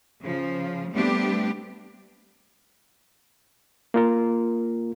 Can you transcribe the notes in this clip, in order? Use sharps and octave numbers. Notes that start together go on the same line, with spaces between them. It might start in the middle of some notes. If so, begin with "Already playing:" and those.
C#3 F3
G3 A3 B3 C4 D4 G4
A#3 F4 A#4